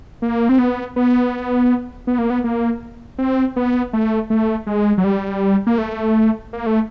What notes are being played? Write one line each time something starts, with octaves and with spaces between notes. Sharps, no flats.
A#3
C4
B3
B3
B3
A#3
B3
A#3
C4
B3
A3
A3
G#3
F#3
G3
A#3
A3
A#3
A3